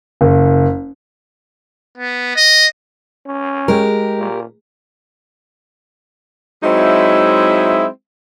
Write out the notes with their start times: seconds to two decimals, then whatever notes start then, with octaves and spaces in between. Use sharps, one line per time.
0.21 F#1
1.98 B3
2.36 D#5
3.26 C#4
3.68 G#3 G4 A#4
4.18 A#2
6.63 F#3 G#3 C4 D#4 E4 E5